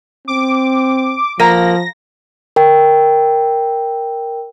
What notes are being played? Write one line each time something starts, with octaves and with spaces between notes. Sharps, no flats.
C4 D6
F3 A#3 F5 F#5 A#5 A#6
A#4 G5